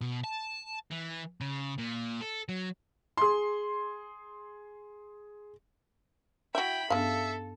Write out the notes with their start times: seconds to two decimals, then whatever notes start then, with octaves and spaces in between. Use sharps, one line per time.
0.01 B2
0.24 A5
0.91 E3
1.41 C#3
1.78 A#2
2.21 A4
2.49 F#3
3.17 G#4 C6
6.55 E4 F#4 E5 G5 B5
6.90 G2 C#3 B3 D4 A4 E5 F5